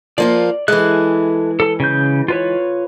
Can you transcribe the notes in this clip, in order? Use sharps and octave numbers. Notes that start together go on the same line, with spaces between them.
F3 A#3 F4 D5
E3 G#3 A4 E5 F#6
A4
C#3 G6
F4 B4 C#5